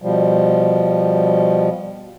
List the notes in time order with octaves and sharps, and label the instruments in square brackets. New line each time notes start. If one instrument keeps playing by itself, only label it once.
[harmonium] B2 F3 G3